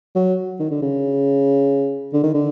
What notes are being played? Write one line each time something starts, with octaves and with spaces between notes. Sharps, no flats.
F#3
D#3
D3
C#3
D3
D#3
D3